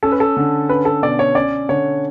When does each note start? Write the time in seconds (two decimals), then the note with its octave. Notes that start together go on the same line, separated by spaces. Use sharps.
0.03 C#4 A4
0.12 B4
0.20 A4
0.37 D3
0.69 C#4 B4
0.85 A4
1.02 B2 D5
1.19 C#5
1.35 C#4 D5
1.69 D3 C#5